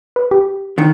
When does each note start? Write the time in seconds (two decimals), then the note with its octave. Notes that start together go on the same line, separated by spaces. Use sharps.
0.16 B4
0.31 G4
0.78 D3 D#3